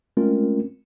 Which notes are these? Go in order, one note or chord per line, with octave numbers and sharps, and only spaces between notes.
G#3 A3 C4 C#4 F4 A#4